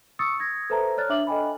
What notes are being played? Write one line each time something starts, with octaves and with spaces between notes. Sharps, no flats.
C#6 D#6 E6 A6 C#7
D#6 G#6 A#6
A4 B4 C5 E5 A5 A#5
C#5 D5 F6 F#6 A6
D4 E5 D6 F#7
A4 D#5 G5 G#5 B5